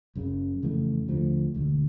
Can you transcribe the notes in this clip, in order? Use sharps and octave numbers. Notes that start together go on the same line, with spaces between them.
F#1 F#2 C#3
F2 C#3 E3 A3
D#2 D3 F3 A3
E1 D2 D3